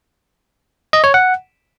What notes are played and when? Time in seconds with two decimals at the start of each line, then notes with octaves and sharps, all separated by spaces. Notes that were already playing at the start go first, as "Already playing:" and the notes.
0.93 D#5
1.04 C#5
1.14 F#5